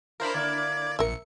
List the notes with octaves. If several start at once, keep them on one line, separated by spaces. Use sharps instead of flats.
D4 E4 F4 A#4 C5 B5
D3 A#3 E4 D5 G#6
A#1 A#4 E5 C#7